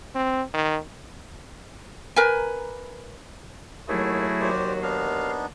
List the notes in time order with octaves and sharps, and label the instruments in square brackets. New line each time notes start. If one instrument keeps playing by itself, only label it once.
[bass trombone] C4
D#3
[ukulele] A#4 B4 G#5
[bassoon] D#2 [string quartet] F#3 F#4 [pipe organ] A3 E4 G#4
[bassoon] D#2 [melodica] G4 C5 D5
[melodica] B3 D4 D#4 [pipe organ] F5